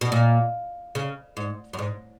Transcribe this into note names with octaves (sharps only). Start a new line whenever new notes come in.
B2
A#2
C#3
G#2
F#2
G#2